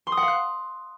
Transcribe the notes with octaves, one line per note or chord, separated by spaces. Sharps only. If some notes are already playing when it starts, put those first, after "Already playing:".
C6
D#6
F#5
F5
F#6